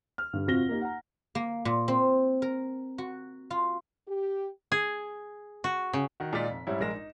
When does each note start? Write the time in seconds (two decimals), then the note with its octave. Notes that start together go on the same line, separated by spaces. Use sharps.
0.18 F6
0.33 G2 D3
0.46 F2 C3 F4 F#4 A#6 G7
0.69 A#3 D#4 G4
0.81 F#5 A#5
1.35 A#3
1.65 A#2
1.88 C4
2.42 A#4
2.98 F#4
3.51 F4
4.08 G4
4.72 G#4
5.64 F#4
5.93 C#3
6.20 D#3 F#4
6.33 A#2 G#3 D#4 F4 D5 B6
6.50 F1
6.67 G#2 G3 C#4 E4
6.80 A#1 G#3 A#4 A#6 E7
6.94 D#4